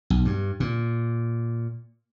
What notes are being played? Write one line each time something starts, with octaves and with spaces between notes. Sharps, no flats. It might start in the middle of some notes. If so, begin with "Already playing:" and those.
B1
G2
A#2